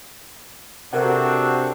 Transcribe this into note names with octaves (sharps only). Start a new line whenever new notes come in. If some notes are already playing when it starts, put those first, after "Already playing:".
C3 C4 D4 F#4 A4 A#4 F#5